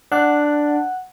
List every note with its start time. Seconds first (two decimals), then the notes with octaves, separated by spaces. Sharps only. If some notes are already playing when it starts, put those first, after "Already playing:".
0.12 D4 F#5 F#6